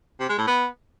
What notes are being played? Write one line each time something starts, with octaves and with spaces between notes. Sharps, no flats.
C3
G#3
A2
B3